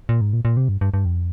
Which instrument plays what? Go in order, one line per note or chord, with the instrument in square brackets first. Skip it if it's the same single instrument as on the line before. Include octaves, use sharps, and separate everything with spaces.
[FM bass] A#2
G#2
A#2
A#2
C3
G2
G2
G2
F2